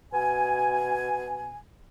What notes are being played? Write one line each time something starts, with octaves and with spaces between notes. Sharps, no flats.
B2 G#5